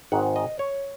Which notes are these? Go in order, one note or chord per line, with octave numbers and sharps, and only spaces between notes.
G#1 G#2 D#3 G#3 F#5
D#5
C#5